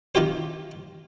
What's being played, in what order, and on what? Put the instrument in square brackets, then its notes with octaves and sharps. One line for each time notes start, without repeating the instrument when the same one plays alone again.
[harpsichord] D#3 D#4 F4 G4 C5